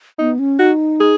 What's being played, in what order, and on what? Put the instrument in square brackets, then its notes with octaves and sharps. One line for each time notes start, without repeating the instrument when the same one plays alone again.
[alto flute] B3 [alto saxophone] D#4
[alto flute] C#4
[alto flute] D#4 [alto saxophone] F#4
[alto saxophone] G#4